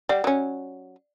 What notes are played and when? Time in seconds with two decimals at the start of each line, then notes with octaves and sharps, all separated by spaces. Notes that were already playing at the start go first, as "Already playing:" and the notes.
0.09 G3 D5 F#5
0.24 F#3 C#4